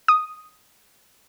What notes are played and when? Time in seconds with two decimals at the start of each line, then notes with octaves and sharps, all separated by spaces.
0.08 D#6